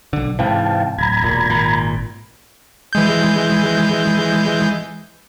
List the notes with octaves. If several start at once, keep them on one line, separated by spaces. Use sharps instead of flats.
B1 D3
G#2 C3 E3 F5 G5 A5
D1 A#5 B5 G#6
E1 A#2
G#1 A#2
E3 G#3 G6